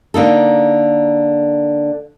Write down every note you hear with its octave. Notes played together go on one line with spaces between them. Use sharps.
D3 A#3 D#4 A4